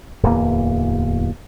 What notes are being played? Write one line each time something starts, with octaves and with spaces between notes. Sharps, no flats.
D1 E2 E3 A#3